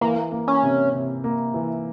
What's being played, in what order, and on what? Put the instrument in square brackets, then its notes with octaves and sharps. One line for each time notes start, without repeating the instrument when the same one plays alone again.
[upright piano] E3 [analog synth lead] A#3
[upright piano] A#3
[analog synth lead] C#4
[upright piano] C3
C3
A#3
E3